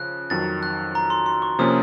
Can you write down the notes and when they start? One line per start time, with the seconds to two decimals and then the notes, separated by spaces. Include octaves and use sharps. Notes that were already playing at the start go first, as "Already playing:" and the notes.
Already playing: C#3 F3 F#6
0.30 F2 D#3 F#3 A6
0.63 F#6
0.95 A#5
1.10 C6
1.26 C6
1.42 C#6
1.59 C3 F3 A#3 C#4 D#6